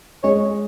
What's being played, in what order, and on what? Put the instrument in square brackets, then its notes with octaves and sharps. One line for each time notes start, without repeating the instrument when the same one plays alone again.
[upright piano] G#3 [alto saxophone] C#5